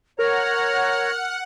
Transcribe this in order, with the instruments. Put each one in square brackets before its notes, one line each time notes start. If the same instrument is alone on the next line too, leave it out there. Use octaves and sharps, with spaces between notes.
[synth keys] A#4 [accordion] C#5 A#5 [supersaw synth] F#5 [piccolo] F6